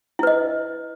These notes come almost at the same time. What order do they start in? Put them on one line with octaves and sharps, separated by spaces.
E4 B4 D#5